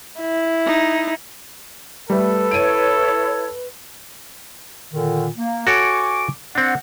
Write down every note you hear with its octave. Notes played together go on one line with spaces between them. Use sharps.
E4
D#4
G3 A3 A4 B4
E4 C#5 D7 D#7
A#2 D3 D#3
A#3
F#4 A4 C#5 G#5 C#6 D6
C4 D4 F#5